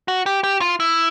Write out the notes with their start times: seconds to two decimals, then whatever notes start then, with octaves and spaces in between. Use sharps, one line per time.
0.08 F#4
0.26 G4
0.44 G4
0.61 F4
0.80 E4